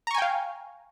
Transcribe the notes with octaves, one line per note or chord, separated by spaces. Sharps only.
F5 G5 G#5 A#5 C#6